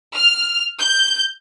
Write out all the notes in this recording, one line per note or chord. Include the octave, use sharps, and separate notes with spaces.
F6
G6